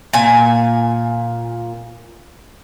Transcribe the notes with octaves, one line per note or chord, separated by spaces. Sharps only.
A#2 G#5